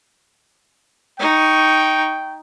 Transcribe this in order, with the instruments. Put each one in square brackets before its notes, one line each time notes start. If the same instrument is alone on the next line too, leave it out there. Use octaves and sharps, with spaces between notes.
[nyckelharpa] D#4 C#6 [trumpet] G5